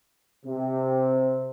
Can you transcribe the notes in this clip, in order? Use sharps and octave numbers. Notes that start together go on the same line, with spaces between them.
C3